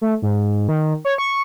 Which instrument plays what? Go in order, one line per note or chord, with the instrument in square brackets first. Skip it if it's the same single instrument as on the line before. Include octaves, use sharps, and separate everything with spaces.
[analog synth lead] A3
G#2
D#3
C#5
C#6